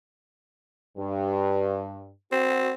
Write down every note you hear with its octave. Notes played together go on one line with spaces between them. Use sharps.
G2
C4 F#4